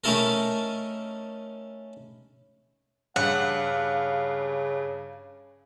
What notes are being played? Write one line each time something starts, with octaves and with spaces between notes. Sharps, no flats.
A3 C#4 D#4 E4 A4 A#4
G2 C#3 F5 F#5